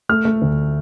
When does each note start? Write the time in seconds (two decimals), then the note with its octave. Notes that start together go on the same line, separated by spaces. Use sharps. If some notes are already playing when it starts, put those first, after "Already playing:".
0.09 A3 F6
0.25 A3
0.42 D2